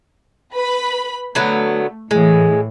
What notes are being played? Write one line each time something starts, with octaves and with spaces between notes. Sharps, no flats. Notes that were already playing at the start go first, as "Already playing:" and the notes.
B4 B5
D3 F#3 A3 B3
A2 E3 G#3